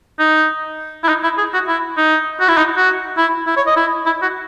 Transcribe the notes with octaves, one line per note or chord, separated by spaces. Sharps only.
D#4
E4
D#4
E4
G#4
F#4
E4
D#4
F#4
E4
D#4
F#4
E4
E4
C#5
D#5
E4
E4
F#4